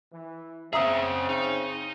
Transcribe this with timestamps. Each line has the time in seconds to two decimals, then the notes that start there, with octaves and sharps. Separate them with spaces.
0.13 E3
0.73 C#3 C4 G#4 E5 F#5 A#5 D#6
1.29 D#4